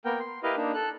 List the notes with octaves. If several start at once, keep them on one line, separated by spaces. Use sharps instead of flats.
A#3 B3 A#4 G5
C6
E4 G4 A#4 B4 D#5 F5
A#3 D4 D#4
A4 F#6